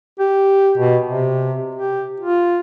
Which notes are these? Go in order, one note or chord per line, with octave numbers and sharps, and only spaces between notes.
G4
B2
C3
G4
F4